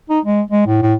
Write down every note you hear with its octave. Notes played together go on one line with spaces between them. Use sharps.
D#4
G#3
G#3
A2
A2